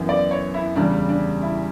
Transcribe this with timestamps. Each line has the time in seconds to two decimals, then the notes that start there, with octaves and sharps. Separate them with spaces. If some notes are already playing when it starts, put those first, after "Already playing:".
Already playing: F#2 E3 B3
0.09 D5
0.31 C#5
0.54 E4
0.76 E2 C#3 G3 D4
1.09 D4
1.42 E4